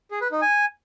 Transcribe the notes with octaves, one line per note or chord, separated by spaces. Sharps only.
G#4
B4
D#4
G#5